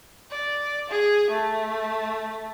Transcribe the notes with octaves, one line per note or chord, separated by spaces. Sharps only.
D5
G#4
A3